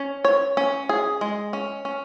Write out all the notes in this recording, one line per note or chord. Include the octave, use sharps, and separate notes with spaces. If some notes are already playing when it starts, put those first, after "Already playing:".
Already playing: C#4
C#5
C#4
G#4
G#3
C#4
C#4